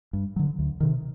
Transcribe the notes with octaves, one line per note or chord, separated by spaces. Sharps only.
G2
D3 F#3
D2
C3 D#3